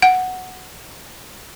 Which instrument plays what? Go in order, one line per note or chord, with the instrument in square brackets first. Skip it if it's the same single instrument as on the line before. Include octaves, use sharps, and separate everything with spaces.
[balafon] F#5